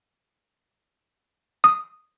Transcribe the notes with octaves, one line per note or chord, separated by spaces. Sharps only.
D#6